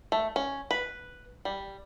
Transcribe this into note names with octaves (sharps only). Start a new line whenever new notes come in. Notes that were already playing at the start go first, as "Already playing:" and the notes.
A3
C#4
B4
G3